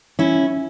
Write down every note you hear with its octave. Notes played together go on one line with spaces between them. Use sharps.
C#4 E4